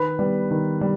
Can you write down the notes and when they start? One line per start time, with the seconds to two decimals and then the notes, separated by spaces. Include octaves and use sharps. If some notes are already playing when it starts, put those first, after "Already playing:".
Already playing: D#3 B4 B5
0.19 G3 B3
0.51 D#3
0.81 G3